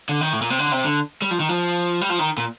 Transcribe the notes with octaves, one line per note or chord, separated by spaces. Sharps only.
D3
D#3
A2
A#2
C3
D3
C3
D3
G3
F3
D#3
F3
G3
F3
D#3
A#2